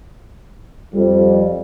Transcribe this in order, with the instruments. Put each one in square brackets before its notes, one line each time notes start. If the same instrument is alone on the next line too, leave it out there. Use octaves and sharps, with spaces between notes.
[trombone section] F2 [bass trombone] G3